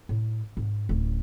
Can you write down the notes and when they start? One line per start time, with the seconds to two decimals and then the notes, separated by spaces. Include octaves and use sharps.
0.09 A2
0.57 G#2
0.89 D1 C#4